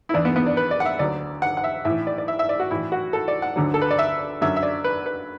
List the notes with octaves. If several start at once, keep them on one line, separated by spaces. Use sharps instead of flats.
E4
E2 E3 D4
B3
B3
D4
B4
D5
F#5
E5
D2 D3 F#3 D5
F#5
F#5
E5
A2 E3 E5
D5
D5
E5
E5
D5
F#4
A2 E3 E4
F#4
A4
D5
F#5
D2 D3 F#3
A4
B4
D5
E5
F#2 D3 F#3 E5
E5
D5
B4
B4